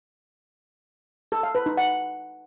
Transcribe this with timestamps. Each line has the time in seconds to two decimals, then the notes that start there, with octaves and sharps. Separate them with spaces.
1.32 A4
1.43 F5
1.55 B4
1.66 D#4
1.77 F#5